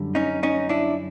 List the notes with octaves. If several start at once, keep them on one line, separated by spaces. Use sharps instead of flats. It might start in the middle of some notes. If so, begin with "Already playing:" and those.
Already playing: F#2 D3 G3
C#4 D#4
C#4 D#4
D4 E4